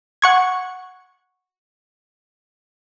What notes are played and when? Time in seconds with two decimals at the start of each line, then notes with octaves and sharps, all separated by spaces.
0.22 F#5 C#6 G#6